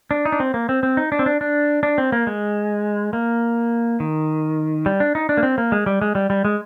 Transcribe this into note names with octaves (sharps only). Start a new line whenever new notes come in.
D4
D#4
D4
C4
A#3
C4
C4
D#4
D4
C4
D4
D4
D4
C4
A#3
G#3
A#3
D#3
G3
D4
D#4
D4
A#3
C4
A#3
G#3
G3
G#3
G3
G3
G#3